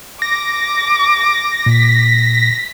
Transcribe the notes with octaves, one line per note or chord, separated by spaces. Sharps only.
D6 A#6
A#2 B6